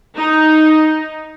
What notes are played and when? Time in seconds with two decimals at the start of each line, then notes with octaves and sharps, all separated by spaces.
0.17 D#4